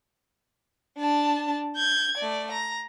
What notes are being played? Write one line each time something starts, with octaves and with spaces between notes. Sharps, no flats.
D4 A5
G6 G#6
A3 D5
A#5